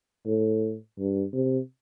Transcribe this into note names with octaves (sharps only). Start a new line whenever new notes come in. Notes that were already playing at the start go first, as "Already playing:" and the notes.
A2
G2
C3